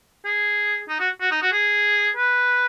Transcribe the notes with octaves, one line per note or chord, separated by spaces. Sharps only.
G#4
D#4
F#4
F#4
D#4
F#4
G#4
B4